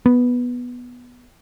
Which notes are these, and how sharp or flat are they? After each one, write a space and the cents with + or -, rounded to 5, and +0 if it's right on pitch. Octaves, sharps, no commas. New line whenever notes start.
B3 -5